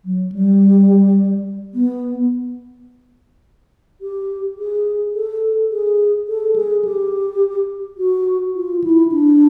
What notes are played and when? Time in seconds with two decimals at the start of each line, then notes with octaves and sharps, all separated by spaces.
0.05 F#3
0.32 G3
1.74 B3
4.01 G4
4.58 G#4
5.14 A4
5.71 G#4
6.28 A4
6.56 G#4
6.85 G4
7.98 F#4
8.55 F4
8.84 E4
9.12 D4